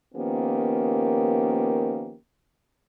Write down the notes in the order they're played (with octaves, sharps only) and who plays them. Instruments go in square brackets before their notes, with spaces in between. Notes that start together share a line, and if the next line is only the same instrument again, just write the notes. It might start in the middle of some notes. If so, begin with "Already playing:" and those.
[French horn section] D#3 F3 A#3 B3 C#4 G4